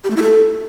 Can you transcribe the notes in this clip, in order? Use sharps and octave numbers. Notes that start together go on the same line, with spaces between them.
G4
A3
E4
A4